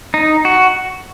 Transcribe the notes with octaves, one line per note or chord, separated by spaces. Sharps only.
D#4
F#4